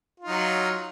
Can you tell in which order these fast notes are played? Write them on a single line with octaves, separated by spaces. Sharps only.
F4 D#4 F#3